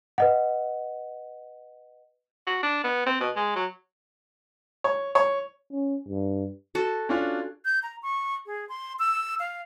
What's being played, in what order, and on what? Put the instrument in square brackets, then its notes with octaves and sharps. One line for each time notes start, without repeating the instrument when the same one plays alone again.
[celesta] B4 D#5 F#5
[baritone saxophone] F#4
D4
B3
C4
B2
G#3
F#3
[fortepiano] C#5
C#5
[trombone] C#4
G2
[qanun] F#4 A4
[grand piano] C#4 D4 F4
[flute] G6
A#5
C#6
G#4
C6
E6
F5